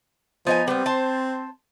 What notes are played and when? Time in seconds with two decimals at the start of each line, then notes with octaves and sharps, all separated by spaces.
0.47 F3 B3 D#4 G#5
0.68 G3 B3 C4
0.86 C5 A5